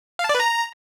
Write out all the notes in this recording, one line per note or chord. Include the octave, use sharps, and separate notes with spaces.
F5
A5
D5
B4
A#5